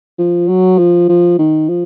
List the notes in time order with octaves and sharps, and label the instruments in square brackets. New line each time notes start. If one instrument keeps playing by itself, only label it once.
[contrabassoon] F3
F#3
F3
F3
D#3
F3